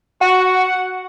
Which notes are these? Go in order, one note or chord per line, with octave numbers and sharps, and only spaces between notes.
F#4 F#5